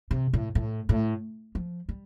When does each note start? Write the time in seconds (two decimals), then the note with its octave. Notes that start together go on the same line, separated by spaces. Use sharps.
0.11 C3
0.33 A2
0.55 A2
0.89 A2
1.55 F3
1.89 G3